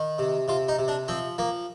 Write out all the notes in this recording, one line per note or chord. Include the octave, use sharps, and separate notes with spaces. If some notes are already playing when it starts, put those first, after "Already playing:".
Already playing: D#3
C3
C3 F4
D#4
C3
D4
F3 C4
F3 A#3